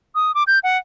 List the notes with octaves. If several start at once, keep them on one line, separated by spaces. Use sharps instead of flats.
D#6
D6
G6
F#5